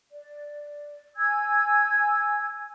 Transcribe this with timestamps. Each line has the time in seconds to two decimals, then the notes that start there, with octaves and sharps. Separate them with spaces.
0.11 D5
1.17 G#5 E6 G#6